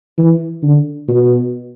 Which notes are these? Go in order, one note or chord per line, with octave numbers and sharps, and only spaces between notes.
E3
D3
B2